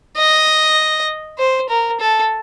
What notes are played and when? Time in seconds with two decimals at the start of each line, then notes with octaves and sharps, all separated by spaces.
0.17 D#5
1.39 C5
1.69 A#4
2.00 A4